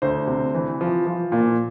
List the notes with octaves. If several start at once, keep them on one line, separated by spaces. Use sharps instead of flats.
D2 C5
C3
E3
F3
F3
A#2